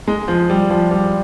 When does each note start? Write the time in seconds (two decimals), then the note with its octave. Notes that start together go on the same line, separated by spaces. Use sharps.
0.08 G#3
0.28 F3
0.50 G3
0.70 F3
0.91 G3